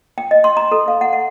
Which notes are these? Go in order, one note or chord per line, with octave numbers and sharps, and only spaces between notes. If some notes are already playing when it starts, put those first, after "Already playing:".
G5
D#5
C6
A#5
A4
F5
F#5
F#5